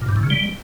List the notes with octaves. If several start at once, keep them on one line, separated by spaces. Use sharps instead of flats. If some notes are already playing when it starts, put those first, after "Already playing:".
A#2
G2
A2
C#3
G3